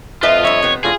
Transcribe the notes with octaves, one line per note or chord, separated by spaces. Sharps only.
F2 F4 B4 D#5 E5 A5
G2 C#5 E5
C3 B3
A2 D3 F4 G#4